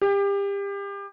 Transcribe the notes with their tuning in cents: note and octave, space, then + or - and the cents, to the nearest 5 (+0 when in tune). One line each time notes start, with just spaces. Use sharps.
G4 +30